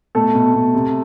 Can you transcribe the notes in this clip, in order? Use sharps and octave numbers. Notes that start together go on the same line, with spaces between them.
B2 A3 A4
B2
B2
C3